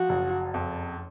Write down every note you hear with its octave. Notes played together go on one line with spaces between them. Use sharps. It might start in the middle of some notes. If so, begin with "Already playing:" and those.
Already playing: F3 F#4
F#1
F2